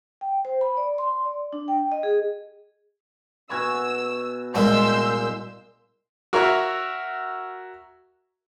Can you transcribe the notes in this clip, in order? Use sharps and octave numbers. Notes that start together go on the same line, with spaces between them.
G5
C5
B5
D5
C6
D5
D4
G5
D#5
G#4
B2 G#5 C#6 E6
C2 A#2 G#3 C6 E6 G6
F#4 A#4 C#5 E5 A#5 C#6